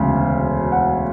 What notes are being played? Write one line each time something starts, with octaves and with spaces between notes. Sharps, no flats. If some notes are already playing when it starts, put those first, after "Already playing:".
Already playing: E1 D2 C#3
F#5